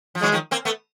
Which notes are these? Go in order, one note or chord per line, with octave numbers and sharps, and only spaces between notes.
F3
E3 F#3 G#3
D#3 F3
A#3 C4
A3 B3